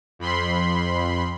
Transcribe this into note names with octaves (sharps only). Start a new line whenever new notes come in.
F2 B5 C6